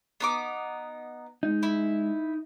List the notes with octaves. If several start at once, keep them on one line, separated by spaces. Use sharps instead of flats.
B3 D#4 D6
G#3 D#4
E4